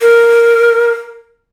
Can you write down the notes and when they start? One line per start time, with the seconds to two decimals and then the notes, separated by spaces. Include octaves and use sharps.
0.01 A#4